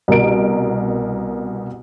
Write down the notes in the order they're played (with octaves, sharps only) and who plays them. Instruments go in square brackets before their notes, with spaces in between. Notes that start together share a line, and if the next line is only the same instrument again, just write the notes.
[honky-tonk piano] C2 B2 A#4 D7